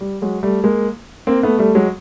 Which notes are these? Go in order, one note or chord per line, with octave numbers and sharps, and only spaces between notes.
G3
F#3 G#3
G3 A3
G#3 A#3
A#3 C4
A3 B3
G3 A3
F#3 G#3